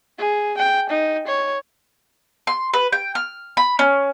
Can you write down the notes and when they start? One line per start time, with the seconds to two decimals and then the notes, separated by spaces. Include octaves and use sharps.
0.19 G#4
0.58 G5
0.90 D#4
1.27 C#5
2.47 C6
2.73 B4
2.92 G5
3.15 F6
3.57 B5
3.79 C#4